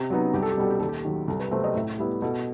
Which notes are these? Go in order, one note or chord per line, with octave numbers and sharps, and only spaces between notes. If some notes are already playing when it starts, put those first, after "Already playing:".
Already playing: C3
F#3 B3 D#4
C2 G4
A4
G4
B2 G3 A4
G4
D#2 A4
G4
D#3 F#3
C2 A4
B4
C3 F#3 A3 C4 C5
D#5
A2 E5
G3 B3 E4 G4
B2 A4